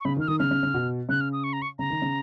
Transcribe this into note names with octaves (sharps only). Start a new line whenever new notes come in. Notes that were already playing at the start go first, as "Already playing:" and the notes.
C#6
C#3 B5
D#3
F6
D#3 D#6
C#3 F6
C#3
C#3
B2
C#3 F#6
F6
D#6
C#6
A#5
C#6
C#3 A#5
D#3
C#3